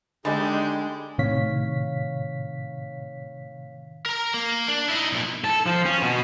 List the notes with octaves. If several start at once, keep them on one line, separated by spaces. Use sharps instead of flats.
D3 G#3 D#4 G4 G#4 D#5 G#5 B5
A2 C3 D#3 C#5 F5 B6
A#4 A#5
A#3
D4
D#4 E4
B1 A#2
A4
F3
C#4
B2